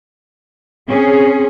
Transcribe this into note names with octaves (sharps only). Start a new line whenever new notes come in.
C4 C#4 G#4